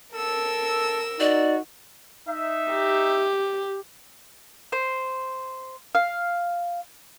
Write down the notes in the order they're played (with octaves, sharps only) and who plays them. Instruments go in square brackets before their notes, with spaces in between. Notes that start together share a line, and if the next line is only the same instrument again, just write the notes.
[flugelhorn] A4 [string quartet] A#4 E6
[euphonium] D#4 [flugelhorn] F#4 [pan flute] D5
[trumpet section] D#4 E5
[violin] G4
[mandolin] C5
F5